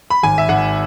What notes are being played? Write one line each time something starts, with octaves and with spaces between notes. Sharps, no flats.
B5
G#1 G#5
E5
G#1 F#5